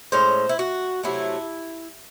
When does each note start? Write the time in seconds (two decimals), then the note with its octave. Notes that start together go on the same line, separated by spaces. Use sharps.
0.12 A2 G#3 C#4 C5
0.49 E4
0.59 F#4
1.03 C3 F#3 A3 E4